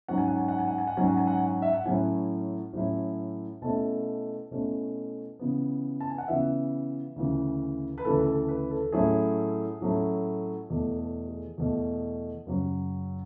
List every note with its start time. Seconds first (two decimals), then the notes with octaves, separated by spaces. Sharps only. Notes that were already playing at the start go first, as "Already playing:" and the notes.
0.08 G#2 F#3 C#4 F#5
0.18 G#5
0.28 F#5
0.38 G#5
0.48 F#5
0.58 G#5
0.68 F#5
0.78 G#5
0.87 F#5
0.97 G#2 F#3 C#4 G#5
1.08 F#5
1.17 G#5
1.27 F#5
1.37 G#5
1.46 F#5
1.62 E5
1.73 F#5
1.85 A2 F#3 C#4 E4 G#5
2.73 A2 F#3 C#4 E4
3.62 B2 A3 C#4 E4 A5
4.51 B2 A3 C#4 E4
5.39 C#3 E3 B3
6.00 A5
6.10 G#5
6.18 F#5
6.27 C#3 E3 B3 E5
7.16 D2 C#3 E3
7.98 B4
8.04 D2 C#3 E3 A4
8.26 A4
8.40 A4
8.48 B4
8.71 A4
8.92 A2 F#3 A3 C#4 E4 G#4
9.81 A2 F#3 A3 C#4 E4
10.70 E2 B2 A3
10.99 A4
11.28 G#4
11.58 E2 B2 A3
12.47 F#2 C#3 F#3